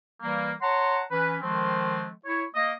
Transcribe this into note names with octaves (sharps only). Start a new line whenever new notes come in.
E3 G3 A#3
C#5 F#5 A5 A#5 C6
E3 C#4 B4
D#3 F3 G#3 A3 C4
E4 C#5
A#3 D#5